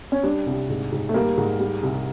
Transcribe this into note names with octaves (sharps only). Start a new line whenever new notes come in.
C#4
G3 D4
C2
G#2
G#2
A3
G3 A#3
G#2
G3
C2